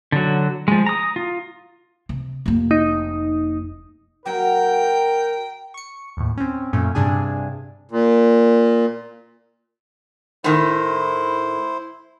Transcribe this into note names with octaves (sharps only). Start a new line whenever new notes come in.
D3 F#3
F3 G#3
A#5 D#6
F4
C3
F1 A#3
D#4
F#3 A#3 F#4 A#4 G5
C#6 C#7
D#2 A2
C4 C#4
F#2 A#2 A3 C#4
G2 C3 D4 G#4 G#5
A#2
A2 D#3 E4 C5